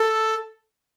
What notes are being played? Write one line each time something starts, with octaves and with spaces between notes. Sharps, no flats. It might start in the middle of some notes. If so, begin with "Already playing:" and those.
Already playing: A4